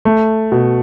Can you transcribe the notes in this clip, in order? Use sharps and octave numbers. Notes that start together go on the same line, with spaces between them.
A3
B2